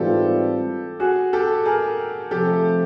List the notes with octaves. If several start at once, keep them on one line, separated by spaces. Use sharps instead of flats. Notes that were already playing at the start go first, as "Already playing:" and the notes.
Already playing: G#2 E3 G3 C4 F4 G4 A4
F#4 G#4
G4 A4
G#4 A#4
C3 F3 A3 C4 G4 A4